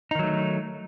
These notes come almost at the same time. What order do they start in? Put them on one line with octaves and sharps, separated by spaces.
D#4 D#3 F#3 A3